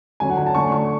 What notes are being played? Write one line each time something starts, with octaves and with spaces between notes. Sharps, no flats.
D3 F#3 C#4 G#5
F#5
G#5
A5
D3 A3 D4 C#6
C#6